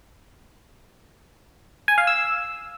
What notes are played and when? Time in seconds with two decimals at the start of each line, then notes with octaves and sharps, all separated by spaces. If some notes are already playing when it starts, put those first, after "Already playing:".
1.88 G#5
1.98 F5
2.07 E6